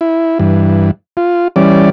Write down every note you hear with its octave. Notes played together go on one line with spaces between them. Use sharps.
E4
G2 E3
F4
E3 G3 C#4 D5